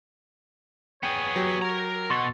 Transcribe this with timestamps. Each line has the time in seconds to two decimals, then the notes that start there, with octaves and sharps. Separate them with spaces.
1.03 B3 G#4 C#5 G5
1.36 F#3 F#4 G4
1.62 A#4 A#5
2.10 B2 F#4 A4 C6 C#6 A6